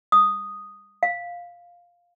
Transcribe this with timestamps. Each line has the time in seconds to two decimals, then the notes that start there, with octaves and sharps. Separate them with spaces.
0.12 D#6
1.03 F5